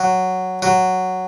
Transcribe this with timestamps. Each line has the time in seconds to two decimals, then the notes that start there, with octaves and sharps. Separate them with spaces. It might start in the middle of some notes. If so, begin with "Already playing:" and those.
Already playing: F#3
0.62 F#3